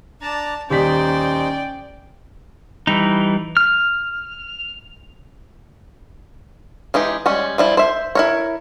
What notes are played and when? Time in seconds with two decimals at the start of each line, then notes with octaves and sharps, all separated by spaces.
0.21 D4 D5 A5 A#5
0.70 D#1 C#4 D#4 C5 D5 G5 B6
2.87 E3 G3 D#4
3.57 F6
6.94 E3 G#3 D#4 G4
7.26 G3 G#3 C#4 C#5
7.58 F3 G3 E4
7.77 C5 E5
8.15 E4 A#4 C#5